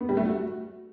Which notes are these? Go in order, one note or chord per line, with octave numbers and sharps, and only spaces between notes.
B3
G3
A3
F#4